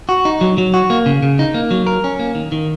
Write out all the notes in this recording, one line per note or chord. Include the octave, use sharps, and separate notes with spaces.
F#4
D#4
F#3
F#3
F#4
A#3
C#3
C#3
D#4
A#3
F#3
A#4
C#4
A#3
D#3
D#3